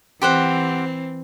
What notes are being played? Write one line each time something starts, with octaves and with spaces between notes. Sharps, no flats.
E3 C4 G4 C5 F#5